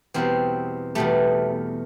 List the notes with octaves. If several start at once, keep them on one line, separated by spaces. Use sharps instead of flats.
E2 B2 G3 C4
E2 B2 G3 A3